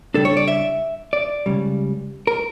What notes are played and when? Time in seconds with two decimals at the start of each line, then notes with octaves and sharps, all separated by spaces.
0.14 C#3 G3 D4 A4
0.25 C#5
0.37 D5
0.48 E5
1.13 D5
1.46 C#2 C#3 G3
2.27 A#4